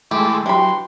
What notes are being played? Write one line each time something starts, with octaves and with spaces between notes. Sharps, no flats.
E3 G#3 A3 G4 D6
E3 F#3 D4 G4 B5 C6